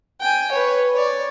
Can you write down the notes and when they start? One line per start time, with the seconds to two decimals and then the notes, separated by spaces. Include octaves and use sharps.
0.21 G5 G#5
0.52 B4 C#5
0.92 C#5 D5